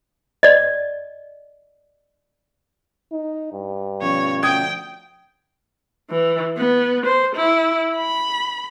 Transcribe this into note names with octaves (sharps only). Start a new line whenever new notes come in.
D5 D#5
D#4
G2
B2 F3 C#4 C#5
D2 G5 D#6 G#6
E3
B3
C5
E4
B5